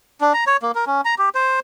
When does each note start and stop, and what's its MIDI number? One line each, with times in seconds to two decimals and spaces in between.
0.21 0.33 62
0.34 0.44 82
0.47 0.57 73
0.62 0.72 58
0.75 0.85 70
0.87 1.01 61
1.05 1.15 82
1.19 1.29 67
1.35 1.60 72